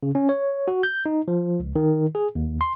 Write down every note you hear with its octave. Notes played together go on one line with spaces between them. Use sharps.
C#3
C#4
C#5
F#4
G6
D#4
F3
C#2
D#3
G#4
D#2
C6